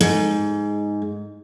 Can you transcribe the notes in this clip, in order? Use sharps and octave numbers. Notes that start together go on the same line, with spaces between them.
G#2